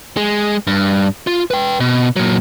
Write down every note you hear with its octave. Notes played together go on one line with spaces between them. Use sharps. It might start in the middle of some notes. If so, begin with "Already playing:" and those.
G#3
G2
F4
B4 G5
B2
A#2 F#3